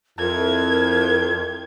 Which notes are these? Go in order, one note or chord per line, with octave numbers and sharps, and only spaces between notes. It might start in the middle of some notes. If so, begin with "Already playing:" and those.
F2 E4 A#4 G#6